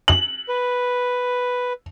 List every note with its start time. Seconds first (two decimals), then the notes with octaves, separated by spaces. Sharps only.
0.08 F#7
0.49 B4